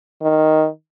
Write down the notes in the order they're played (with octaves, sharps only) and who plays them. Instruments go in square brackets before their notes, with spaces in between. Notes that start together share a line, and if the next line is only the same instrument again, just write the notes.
[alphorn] D#3